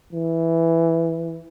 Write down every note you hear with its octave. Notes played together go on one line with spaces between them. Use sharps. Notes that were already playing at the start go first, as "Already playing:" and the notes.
E3